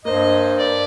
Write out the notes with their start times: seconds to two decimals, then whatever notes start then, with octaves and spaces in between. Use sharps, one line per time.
0.05 G2 A#3 C5 D#5
0.59 D5